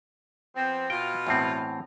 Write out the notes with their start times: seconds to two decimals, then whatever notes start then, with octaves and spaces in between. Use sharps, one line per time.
0.56 F3 B3 C4
0.90 B2 F4 G5
1.27 E2 A2 C4